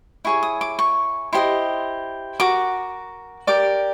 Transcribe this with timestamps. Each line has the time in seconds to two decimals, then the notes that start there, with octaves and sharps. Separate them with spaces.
0.25 E4 G#4 C#5 C#6
0.43 D#6
0.61 D6
0.79 C#6
1.33 E4 G4 C5 D#5 C6
2.40 F#4 A#4 D6
3.47 G4 A#4 D5 D6